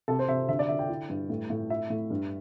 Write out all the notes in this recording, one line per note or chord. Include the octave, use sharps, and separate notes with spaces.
C3 A4
C5
C3 E5
D3 E5
D5
D3 E5
G5
E4
G2
A2
A2
E4 E5
A2
G2